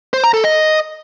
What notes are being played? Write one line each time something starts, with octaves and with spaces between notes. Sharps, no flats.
C5
A#5
A4
D#5